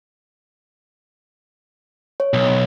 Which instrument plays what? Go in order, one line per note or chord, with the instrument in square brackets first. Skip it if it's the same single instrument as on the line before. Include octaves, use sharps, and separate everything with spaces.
[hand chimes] C#5
[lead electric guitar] B1